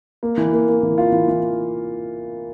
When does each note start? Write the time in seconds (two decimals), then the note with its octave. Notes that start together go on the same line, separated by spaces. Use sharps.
0.23 A#3
0.38 E3
0.53 A#3
0.69 A#3
0.83 E3
0.98 F4
1.12 E3
1.28 E3